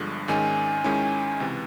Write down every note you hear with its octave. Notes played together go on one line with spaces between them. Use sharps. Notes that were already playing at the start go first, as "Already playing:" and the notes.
Already playing: G1 G2 D3 F3 G#3
G#1 G#2 D#3 G#3 C#4 G#5
G#2 D#3 G#3 C#4 E4
C#2 C3 E3